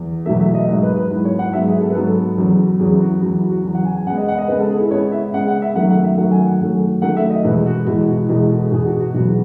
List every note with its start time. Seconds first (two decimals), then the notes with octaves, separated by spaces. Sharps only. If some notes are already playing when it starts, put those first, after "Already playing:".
Already playing: E2
0.26 E2 B2 F#3 A3 E5
0.40 E5
0.54 D#5
0.68 G#2 F#3 B3 D#5
0.83 B4
0.97 B4
1.11 G#2 F#3 B3 E4
1.25 C#5
1.39 F#5
1.53 G#2 F#3 B3 E5
1.67 G#4
1.81 A4
1.90 B4
1.95 G#2 F#3 B3 A4
2.38 E2 C#3 F#3
2.80 E2 C#3 F#3 G#4
2.92 E4
3.00 F#4
3.22 E2 C#3 F#3 F#4
3.36 E4
3.50 F#4
3.64 E2 C#3 F#3
3.74 F#5
3.85 G#5
3.96 G#5
4.07 C#3 G#3 B3 F#5
4.17 D#5
4.28 F#5
4.38 D#5
4.48 C#3 G#3 B3 B4
4.60 A4
4.70 G#4
4.80 E4
4.91 C#3 G#3 B3 C#5
5.12 E5
5.34 C#3 G#3 B3 F#5
5.48 F#5
5.62 E5
5.75 F#2 D#3 F#3 A3 F#5
5.90 F#5
6.04 E5
6.18 F#2 D#3 F#3 A3 F#5
6.31 G#5
6.46 F#5
6.60 F#2 D#3 F#3 A3
7.02 F#2 D#3 F#3 A3 F#5
7.17 E5
7.30 D#5
7.44 E2 B2 G#3 B4
7.66 F#4
7.87 E2 B2 G#3 E4
8.09 F#4
8.29 E2 B2 G#3 E4
8.50 A4
8.71 E2 B2 G#3 G#4
8.86 F#4
9.00 F#4
9.14 E2 B2 F#3 B3 F#4
9.24 G#4